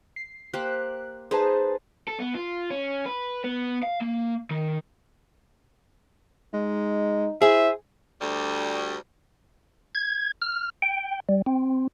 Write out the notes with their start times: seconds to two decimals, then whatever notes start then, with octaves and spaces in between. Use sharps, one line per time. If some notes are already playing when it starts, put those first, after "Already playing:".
0.16 C7
0.53 A#3 G4 C5 F#6
1.31 D#4 G#4 B4 C5 A5
2.08 A4
2.20 B3
2.35 F4
2.71 C#4
3.05 B4
3.44 B3
3.83 F5
4.02 A#3
4.50 D#3
6.54 G#3 D#4
7.42 E4 G#4 C5 E5
8.21 D2 G3
9.95 G#6
10.42 F6
10.82 G5
11.29 G3
11.46 C4